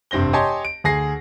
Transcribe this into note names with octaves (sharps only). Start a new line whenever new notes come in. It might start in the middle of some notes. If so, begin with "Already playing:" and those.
F1 G2 C4 A#6 G7
G4 C#5 D#5 G#5 A5 C6
D7
D2 G#4 A#6 C7